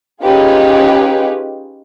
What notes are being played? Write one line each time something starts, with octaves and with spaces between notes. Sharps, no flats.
C#4 D#4 F4 G4 G#4 B4